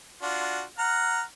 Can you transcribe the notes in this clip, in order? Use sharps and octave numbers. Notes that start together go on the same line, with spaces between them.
D4 F4 F#4
F#5 A#5 F6